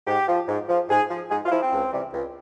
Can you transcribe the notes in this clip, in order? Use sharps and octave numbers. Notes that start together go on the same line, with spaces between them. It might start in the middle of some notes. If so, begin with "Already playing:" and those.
G#2 G4
F3
G#2
F3
G#2 G#4
F3
G#2 G#4
F4
F3 E4
C4
C#2
C3 E3 G3
C#2